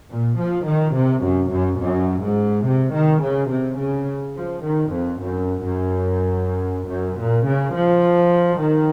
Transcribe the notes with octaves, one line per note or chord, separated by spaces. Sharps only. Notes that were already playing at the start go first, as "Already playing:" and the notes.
A#2
F3
D#3
C3
F#2
F#2
F#2
G#2
C3
D#3
C#3
C3
C#3
F3
D#3
F2
F#2
F#2
F#2
A#2
C#3
F3
D#3